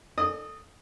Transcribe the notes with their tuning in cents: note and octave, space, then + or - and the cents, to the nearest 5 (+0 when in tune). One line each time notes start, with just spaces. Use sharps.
A4 +0 D#5 -45 D#6 +0